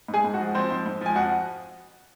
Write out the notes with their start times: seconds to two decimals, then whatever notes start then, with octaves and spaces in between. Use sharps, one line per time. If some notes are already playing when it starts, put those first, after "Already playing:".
0.08 G#2
0.14 G#4 G#5
0.24 G#2
0.34 F#4 F#5
0.39 F3
0.55 F3 C4 C5
0.70 G#2
0.86 G#2
1.01 F3 G#5
1.16 F2 F#4 F#5